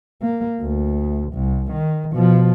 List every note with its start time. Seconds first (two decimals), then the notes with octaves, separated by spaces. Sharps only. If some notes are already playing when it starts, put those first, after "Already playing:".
0.22 A#3
0.61 D2
1.33 C2
1.72 D#3
2.13 B2 F3